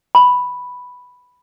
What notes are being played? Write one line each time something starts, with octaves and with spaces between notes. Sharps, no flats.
B5